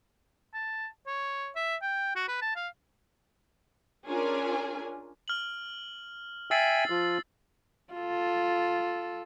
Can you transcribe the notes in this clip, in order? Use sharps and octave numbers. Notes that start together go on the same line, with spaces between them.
A5
C#5
E5
G5
F#4
B4
A5
F5
C#4 D4 F4 G#4 A#4 G#5
F6 F#7
E5 G5 G#5 E6 A6 C7
F3 F4
F4 A4